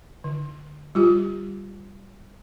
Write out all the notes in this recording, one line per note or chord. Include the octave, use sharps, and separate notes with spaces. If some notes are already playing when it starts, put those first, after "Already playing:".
D3
G3 F4 G4